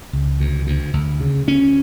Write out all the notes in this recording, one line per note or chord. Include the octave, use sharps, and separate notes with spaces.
C#2
D2
D2
D2
C#3
D2 C#4